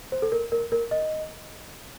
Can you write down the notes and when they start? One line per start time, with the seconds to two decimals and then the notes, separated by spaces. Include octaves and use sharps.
0.12 C5
0.22 A4
0.32 A#4
0.52 A#4
0.72 A#4
0.91 D#5